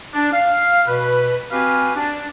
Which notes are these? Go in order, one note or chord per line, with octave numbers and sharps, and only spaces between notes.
D4
F5
B2 B4
C4 F#4 G4 B4 F5 G#5
D4